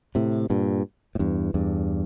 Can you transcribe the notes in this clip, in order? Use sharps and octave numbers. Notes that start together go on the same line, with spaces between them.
A2 C3
G2 A#2
A2
E2 G2
E2 G2